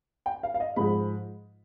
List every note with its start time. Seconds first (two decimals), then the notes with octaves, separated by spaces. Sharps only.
0.26 G5
0.43 F5
0.54 F5
0.60 D#5
0.76 G#2 F3 G#3 B5